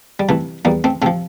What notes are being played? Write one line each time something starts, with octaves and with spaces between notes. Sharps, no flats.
G3
C3 E3 A3
E2 G3 A#3
A3 C4
C3 F3 A3 C4